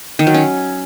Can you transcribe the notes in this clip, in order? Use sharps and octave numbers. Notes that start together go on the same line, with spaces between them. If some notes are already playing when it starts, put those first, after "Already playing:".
D#3
F#3
C#4